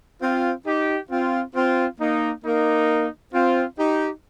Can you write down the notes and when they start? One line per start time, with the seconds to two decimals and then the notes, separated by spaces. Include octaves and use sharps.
0.22 C4 F4
0.67 D#4 G4
1.11 C4 F4
1.55 C4 F4
2.00 A#3 D#4
2.45 A#3 D#4
3.34 C4 F4
3.79 D#4 G4